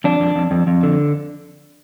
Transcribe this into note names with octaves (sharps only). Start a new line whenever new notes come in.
F2 D4
F2
F2
F2
F2
D3